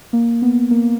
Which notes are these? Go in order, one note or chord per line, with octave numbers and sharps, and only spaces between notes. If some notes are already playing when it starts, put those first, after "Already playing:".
A#3
B3
A#3